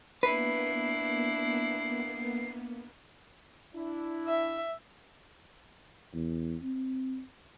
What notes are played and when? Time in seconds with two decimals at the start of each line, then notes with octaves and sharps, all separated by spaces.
0.23 A#3 B3 D4 E4 B4 C7
3.75 D4 E4
4.27 E5
6.14 E2
6.63 C4